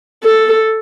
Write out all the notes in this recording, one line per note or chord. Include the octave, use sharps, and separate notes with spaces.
A4